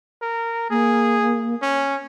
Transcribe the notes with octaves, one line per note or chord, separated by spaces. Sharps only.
A#4
A#3 G#4
C#4